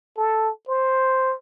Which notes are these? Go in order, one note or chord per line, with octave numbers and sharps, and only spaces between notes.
A4
C5